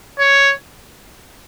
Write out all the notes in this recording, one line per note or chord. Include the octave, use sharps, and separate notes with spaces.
C#5